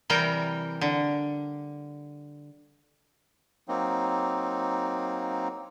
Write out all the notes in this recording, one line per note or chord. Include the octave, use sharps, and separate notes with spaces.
C3 E3 G3 A#4 G5
D3
F#3 A#3 C4 D#4